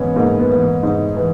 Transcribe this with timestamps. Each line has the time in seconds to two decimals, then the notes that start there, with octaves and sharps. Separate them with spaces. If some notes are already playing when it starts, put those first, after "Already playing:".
Already playing: G#2 E3 B3 C#4
0.16 G#2 A#3
0.39 B3
0.50 E3
0.61 B3
0.83 G#2 D#4
1.17 E3